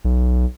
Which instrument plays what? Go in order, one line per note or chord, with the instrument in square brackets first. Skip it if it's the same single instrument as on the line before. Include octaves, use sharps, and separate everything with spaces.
[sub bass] B1